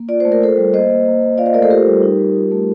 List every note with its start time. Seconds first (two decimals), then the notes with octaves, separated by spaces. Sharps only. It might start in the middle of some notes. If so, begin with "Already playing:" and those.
Already playing: A#3
0.09 F4 D5
0.20 A3 C5
0.32 A#4
0.41 F4 A4 C5
0.57 G3
0.73 A#3 C5 D#5
0.90 A#3
1.06 A#3
1.22 A#3
1.38 F4 D5 F5
1.46 C5 D#5
1.54 A3 A#4 D5
1.62 A4 C5
1.70 F4 G4 A#4
1.87 G3
2.03 D#4
2.19 G3
2.36 F4
2.52 A3